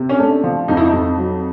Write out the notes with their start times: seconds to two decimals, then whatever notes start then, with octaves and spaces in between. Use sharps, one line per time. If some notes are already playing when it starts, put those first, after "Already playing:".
Already playing: C3
0.09 C#4
0.19 A3 D4
0.44 F3
0.68 F2 D#4
0.77 E4
0.85 D#4
0.93 F2
1.17 F#3